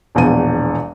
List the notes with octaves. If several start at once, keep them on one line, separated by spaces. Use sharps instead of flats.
E1 A#1 B3 D#7